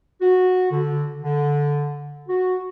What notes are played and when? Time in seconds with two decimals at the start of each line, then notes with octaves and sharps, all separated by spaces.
0.22 F#4
0.71 D3
1.24 D3
2.29 F#4